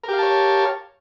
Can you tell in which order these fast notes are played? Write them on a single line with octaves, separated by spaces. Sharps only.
A#4 G4 F5 A5 C#5